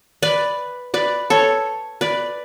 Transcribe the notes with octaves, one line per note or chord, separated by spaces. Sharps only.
B4 D5
B4 D5
A4 C#5
B4 D5